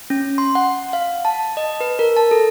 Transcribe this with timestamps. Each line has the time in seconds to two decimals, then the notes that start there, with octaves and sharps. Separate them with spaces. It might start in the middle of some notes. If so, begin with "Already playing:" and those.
0.10 C#4
0.38 C6
0.55 F#5
0.93 F5
1.25 A5
1.57 D#5
1.81 B4
1.99 A#4
2.16 A5
2.31 A4